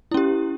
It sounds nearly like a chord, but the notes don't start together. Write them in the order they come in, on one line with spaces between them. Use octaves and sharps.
E4 C#4 G4